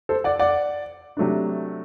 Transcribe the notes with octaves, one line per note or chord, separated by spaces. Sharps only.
A4 C5
D5 F#5
D5 F#5
C3 F#3 A3 D4